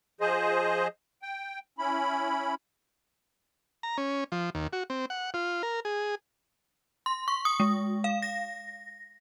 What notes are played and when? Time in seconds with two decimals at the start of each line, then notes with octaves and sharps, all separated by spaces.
0.21 F3 G#4 C5 D#5
1.22 G5
1.79 C#4 E4 B5
3.83 A#5
3.98 C#4
4.32 F3
4.55 D#2
4.73 F#4
4.90 C4
5.10 F#5
5.34 F4
5.63 A#4
5.85 G#4
7.06 C6
7.28 C#6
7.45 D#6
7.60 G#3
8.04 F5
8.22 A#6